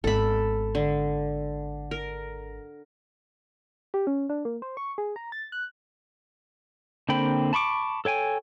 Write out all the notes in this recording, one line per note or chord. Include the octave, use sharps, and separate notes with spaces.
G#1 B3 A4 B5
D3
A#4
G4
C#4
D4
A#3
C5
C#6
G#4
A#5
A6
F#6
D3 A#3 C4 G5 B5
A5 B5 C#6 D6
A4 C#5 G5 G#5